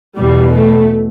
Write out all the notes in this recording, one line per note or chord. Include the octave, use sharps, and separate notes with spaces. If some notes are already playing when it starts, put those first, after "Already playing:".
E2 B2 G3
A3